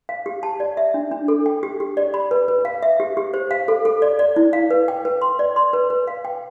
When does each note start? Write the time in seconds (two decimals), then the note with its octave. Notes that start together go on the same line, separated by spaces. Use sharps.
0.09 F5
0.26 G4
0.43 A5
0.60 D5
0.77 E5
0.94 D4
1.11 D4
1.28 A4
1.46 G5
1.63 G4
1.80 G4
1.97 D5
2.14 B5
2.31 B4
2.48 B4
2.65 F5
2.83 E5
3.00 G4
3.17 G4
3.34 C5
3.51 F5
3.68 A4
3.85 A4
4.02 D5
4.19 D5
4.36 E4
4.53 F5
4.71 B4
4.88 G5
5.05 B4
5.22 C6
5.39 D5
5.56 C6
5.73 B4
5.90 B4
6.07 F5
6.25 G5